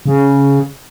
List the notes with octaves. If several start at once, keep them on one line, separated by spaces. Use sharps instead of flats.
C#3